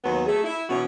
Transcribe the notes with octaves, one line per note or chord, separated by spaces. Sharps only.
D#2 F#3 B3
A3 G#4
E4
B2 E3 C#4 F#4